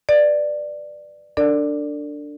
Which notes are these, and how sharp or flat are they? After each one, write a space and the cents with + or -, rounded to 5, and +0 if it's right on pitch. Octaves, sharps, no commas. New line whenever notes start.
B4 +0 D5 +10
D4 +0 A4 +45 D5 +0